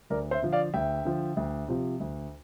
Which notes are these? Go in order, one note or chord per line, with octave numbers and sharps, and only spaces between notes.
D2 A#4 D5
C5 E5
D3 F3
D5 F5
D2 E5 G5
D3 F3
D2
C3 F3
D2